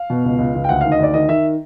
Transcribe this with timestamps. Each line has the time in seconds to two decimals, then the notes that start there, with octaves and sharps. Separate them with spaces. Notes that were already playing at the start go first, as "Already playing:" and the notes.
Already playing: F5
0.10 B2
0.24 C#2
0.38 C#2
0.55 C#2
0.64 G5
0.69 D2 F#5
0.81 D#3 F5
0.92 D#5
0.99 D2 D5
1.14 D#3 D#5
1.29 D#3 E5